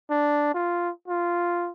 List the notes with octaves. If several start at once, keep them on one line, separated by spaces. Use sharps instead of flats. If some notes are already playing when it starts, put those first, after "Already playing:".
D4
F4
F4